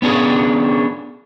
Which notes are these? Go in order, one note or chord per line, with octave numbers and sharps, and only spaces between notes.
B3 C#4 D4 F4 G#4